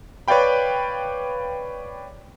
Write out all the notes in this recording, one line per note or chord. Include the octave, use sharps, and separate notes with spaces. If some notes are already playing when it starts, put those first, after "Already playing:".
B4 C#5 D5 F5 G5 B5